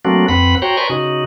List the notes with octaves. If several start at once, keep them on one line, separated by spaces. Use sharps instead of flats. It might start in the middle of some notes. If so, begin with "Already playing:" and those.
F#3 A3 A#3 C4 D4 F#4
F2 C4 B4 F#5 B5
F#4 C5 C#5 G5 A#5
B4 D5 G#5 A#5 C6 C#6
C#3 D#4 F#4